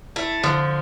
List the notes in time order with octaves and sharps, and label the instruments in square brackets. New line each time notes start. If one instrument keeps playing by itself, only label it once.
[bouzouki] A3 [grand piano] E4
[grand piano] D3 [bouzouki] F3